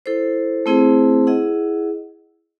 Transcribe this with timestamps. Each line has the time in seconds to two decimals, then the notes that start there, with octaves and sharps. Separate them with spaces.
0.06 E4 A4 C5
0.66 A3 C4 E4 G#4 C5
1.27 E4 G#4 D#5 F#5